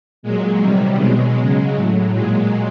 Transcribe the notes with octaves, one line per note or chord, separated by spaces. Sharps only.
A#2 F#3 G#3
C3 D#3 F#3 G3
B2 F#3 G#3
C#3 F#3
A2 F#3
A#2 F#3 G#3